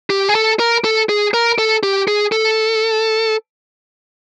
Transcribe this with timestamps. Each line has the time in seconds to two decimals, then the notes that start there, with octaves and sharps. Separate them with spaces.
0.10 G4
0.29 G#4
0.35 A4
0.59 A#4
0.84 A4
1.09 G#4
1.34 A#4
1.58 A4
1.83 G4
2.08 G#4
2.32 A4